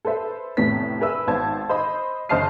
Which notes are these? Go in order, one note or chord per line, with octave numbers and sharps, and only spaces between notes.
A4 B4 C5 E5
F1 A2 C3 B3 B6
G#4 A#4 B4 E5 E6
G#1 B3 C5 A5 G#6
C5 D#5 B5
F#1 C5 D#5 A5 F6 C7